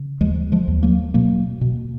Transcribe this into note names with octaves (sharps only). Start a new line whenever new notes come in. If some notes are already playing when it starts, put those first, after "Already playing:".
Already playing: C#3
D#2 F3 G#3
F3 G#3
D#2
F#3 A#3
B2 F#3 A#3
B2